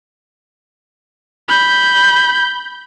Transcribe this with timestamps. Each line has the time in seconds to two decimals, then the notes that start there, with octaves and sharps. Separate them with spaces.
1.49 B5 G6